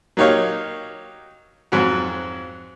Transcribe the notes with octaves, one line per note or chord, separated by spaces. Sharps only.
F#3 A#3 D#4 G4 C#5 F5
F2 G#2 F#3 F#4